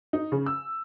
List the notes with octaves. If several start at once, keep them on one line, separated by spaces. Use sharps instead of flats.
D#4
C#3
E6